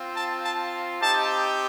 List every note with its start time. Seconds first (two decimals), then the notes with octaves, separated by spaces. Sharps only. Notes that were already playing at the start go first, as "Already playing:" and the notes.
Already playing: C4 F4
0.14 A5
0.43 A5
1.00 C4 D#4 G4 A5